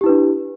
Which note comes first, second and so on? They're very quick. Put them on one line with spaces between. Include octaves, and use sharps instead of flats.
G4 E4 B4 D4